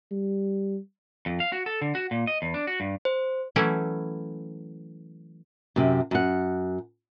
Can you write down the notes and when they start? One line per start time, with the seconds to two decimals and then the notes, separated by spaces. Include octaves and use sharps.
0.11 G3
1.26 F2
1.40 F5
1.52 F#4
1.66 A4
1.81 D3
1.95 F#4
2.11 A#2
2.27 D#5
2.42 E2
2.54 D4
2.67 F#4
2.80 G2
3.05 C5
3.56 E3 F#3 A3 C#4 E4
5.76 F#2 C3
6.11 F#2 F#5